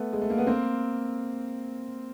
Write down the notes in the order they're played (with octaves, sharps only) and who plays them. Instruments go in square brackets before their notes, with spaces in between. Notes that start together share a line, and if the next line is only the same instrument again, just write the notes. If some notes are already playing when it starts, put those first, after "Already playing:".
Already playing: [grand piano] A3 B3
G#3
A3
A#3
B3
A#3 C4